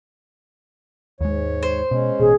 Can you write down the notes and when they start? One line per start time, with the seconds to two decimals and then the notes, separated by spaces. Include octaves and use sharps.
1.21 D#2 G#2 G#3 C#5
1.63 C5
1.91 B2 G#3 C#4
2.20 A1 B2 G#4